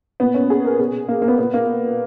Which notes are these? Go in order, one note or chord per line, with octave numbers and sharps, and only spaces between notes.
A#2 B3
C#4
G#4
A#4
B2 G#4
A#3
A#3
B3
A#2 B3
A#3